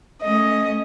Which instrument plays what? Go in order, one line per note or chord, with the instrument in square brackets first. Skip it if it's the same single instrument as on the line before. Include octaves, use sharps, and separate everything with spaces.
[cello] A3 C#4 [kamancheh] D#5